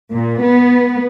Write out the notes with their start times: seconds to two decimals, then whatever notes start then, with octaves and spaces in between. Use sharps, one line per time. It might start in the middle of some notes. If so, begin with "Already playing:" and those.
0.12 A#2
0.43 B3